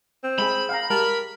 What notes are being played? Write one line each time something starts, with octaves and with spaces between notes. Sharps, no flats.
C4
G#3 G#4 B5
F5 G5 A#5
G#3 G4 A#4 A5